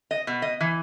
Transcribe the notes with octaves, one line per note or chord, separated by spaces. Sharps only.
D#5
B2
D#5
E3